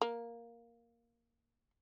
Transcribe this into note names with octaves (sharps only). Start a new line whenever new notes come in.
A#3